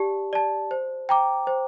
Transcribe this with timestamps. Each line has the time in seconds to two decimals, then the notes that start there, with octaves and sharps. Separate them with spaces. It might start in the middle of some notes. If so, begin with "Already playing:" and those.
Already playing: G4 D5 A5
0.33 D5 A5
0.71 C5
1.09 G5 A#5 D6
1.47 C5